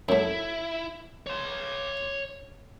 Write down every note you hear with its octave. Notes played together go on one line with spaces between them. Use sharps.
F#2 A3 E4
C#5 C6